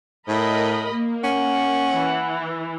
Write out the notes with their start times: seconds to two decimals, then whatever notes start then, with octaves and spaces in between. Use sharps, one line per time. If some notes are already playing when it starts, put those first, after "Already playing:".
0.28 A2 A#4 D#5 B5
0.92 A#3
1.24 C#4 F#5
1.93 E3